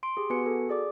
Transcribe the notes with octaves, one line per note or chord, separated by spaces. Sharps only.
C6 D7
G4 G#4
B3 F#4 B4 G#5 C#7
F#4 A4
G#4 D5 D6